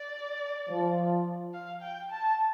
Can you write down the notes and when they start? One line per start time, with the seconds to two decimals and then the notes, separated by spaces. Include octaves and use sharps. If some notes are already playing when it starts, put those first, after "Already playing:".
Already playing: D5
0.69 F3
1.54 F5
1.81 G5
2.10 A5